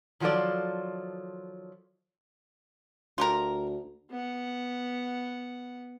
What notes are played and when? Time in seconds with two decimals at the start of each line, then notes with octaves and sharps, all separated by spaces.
0.20 D#3 F3 F#3 F4 A4 D5
3.18 D2 F4 G4 A#4
4.10 B3 F#5